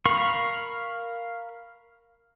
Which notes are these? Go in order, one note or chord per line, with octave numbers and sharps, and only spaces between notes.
A#4 F5 B5 C#6